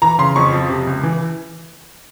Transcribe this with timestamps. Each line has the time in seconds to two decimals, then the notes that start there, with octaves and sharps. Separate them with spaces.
0.02 E3 A#5
0.19 C#3 C6
0.36 F2 C#6
0.53 F3
0.70 C3
0.87 C#2
1.03 E3